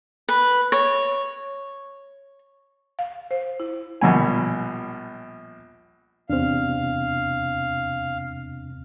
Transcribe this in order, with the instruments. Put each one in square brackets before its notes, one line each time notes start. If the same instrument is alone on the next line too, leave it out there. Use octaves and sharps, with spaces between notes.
[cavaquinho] B4
C#5
[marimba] F5
C5
E4
[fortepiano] A#1 B2 G3 G#5
[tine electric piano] E2 C3 [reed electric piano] C4 D4 [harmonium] F5